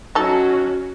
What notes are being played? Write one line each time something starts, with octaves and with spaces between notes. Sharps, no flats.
F#3 C#4 D#4 F#4 A4